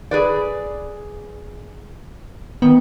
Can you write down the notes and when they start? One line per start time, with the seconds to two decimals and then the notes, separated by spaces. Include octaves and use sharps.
0.11 G#4 B4 D5
2.62 D#3 B3